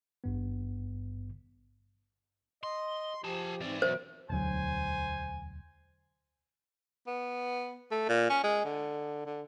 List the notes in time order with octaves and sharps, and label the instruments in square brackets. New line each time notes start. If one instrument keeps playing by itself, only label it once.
[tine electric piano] G#1 G2 B3
[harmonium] D#5 [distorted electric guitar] C6
[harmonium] F3 G4 [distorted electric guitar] G#4 A5
[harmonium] G#2 C4 [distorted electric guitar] E3 D5
[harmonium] B2 F#3 E5 [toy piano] C5
[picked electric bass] E1 D2 F#3 [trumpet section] C5 G#5
[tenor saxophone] B3
A3
A#2
C#4
G#3
D3
D3